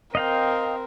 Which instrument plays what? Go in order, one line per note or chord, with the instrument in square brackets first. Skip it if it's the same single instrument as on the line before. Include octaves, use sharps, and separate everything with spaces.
[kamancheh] C4 A#4 [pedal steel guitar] D#5 F5 G5